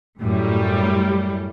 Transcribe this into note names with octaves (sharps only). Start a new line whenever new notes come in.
F#2 A2 G3